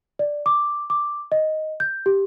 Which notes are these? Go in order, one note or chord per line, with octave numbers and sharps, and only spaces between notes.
D5
D6
D6
D#5
G6
G4